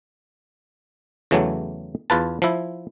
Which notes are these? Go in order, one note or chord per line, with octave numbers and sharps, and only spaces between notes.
E2 C#3 E3 F#3 A3
E2 F4 B4 A5
F3 E4